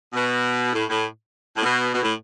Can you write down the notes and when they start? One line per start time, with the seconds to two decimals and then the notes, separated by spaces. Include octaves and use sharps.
0.13 B2
0.73 A2
0.88 A2
1.56 A2
1.62 B2
1.93 B2
2.03 A2